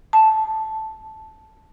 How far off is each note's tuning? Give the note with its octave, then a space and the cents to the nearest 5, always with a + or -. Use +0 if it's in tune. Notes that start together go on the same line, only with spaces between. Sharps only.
A5 -10